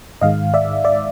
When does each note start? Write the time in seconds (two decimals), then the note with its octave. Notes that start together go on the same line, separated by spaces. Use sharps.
0.21 G#2 D#3 G#3 D#5 F5
0.54 D5 E5
0.85 D5 E5